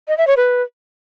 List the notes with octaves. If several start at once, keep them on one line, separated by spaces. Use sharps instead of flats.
D#5
E5
C#5
B4